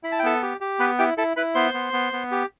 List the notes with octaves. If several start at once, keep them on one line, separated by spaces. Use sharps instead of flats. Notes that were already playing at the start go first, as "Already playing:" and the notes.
E4 B5
A5
G5
B3 A4 A5
G4
G4
B3 B4 B5
E4 G4 G5
E4 A4 A5
E4 B4 B5
B3 C5 C6
B3
B3
B3
G4